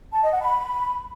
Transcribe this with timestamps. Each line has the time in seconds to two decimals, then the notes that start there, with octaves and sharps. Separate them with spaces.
0.13 A5
0.22 D#5
0.32 F#5
0.41 B5